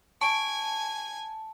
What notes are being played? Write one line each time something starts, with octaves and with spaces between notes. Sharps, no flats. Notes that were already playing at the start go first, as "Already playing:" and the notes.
G#5 A5 C#6 D7